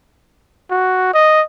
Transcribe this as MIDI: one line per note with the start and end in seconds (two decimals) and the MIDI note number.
0.70 1.12 66
1.13 1.42 75